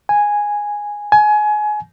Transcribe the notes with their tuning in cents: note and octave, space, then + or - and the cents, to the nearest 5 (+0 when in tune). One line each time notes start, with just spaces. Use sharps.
G#5 -5
G#5 +25